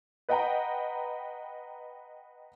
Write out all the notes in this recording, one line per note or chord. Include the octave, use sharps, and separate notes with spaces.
B4 D#5 F#5 G5 A#5 B5